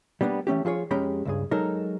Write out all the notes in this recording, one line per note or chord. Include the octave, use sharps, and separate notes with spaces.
G3 A#3 B3 C#4 D4
E3 A3 C#4 G4
F3 F4 G#4 C#5
F2 G#3 C#4 G4 A#5 B5
C#2 G2 G#4
F#3 G#3 D#4 A4 A#4